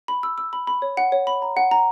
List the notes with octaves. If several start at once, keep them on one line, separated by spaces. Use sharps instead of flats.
B5
E6
E6
B5
B5
C#5
F#5
C#5
B5
A#5
F#5
A#5